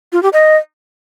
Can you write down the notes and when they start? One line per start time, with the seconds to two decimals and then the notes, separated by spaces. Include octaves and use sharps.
0.13 F4
0.23 G4
0.33 D#5